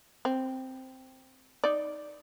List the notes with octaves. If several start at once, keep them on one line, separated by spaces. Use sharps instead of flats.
C4
D#4 D5